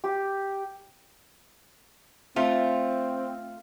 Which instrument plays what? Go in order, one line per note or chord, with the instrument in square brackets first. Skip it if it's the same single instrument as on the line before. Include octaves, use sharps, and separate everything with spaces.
[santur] G4
[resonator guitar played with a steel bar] A3 F4 [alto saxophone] C4